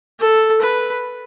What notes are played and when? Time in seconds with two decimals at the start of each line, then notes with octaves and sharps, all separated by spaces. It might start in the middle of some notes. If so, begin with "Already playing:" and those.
0.21 A4
0.62 B4